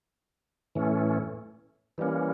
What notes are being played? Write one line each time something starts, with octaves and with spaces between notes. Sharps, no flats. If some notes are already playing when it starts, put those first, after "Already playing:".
A2 E3 A3 C#4
E3 G3 A#3 C#4